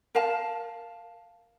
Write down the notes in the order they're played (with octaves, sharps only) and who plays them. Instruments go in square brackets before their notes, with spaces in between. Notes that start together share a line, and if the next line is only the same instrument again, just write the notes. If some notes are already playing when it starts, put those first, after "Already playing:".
[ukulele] A#4 F5 A5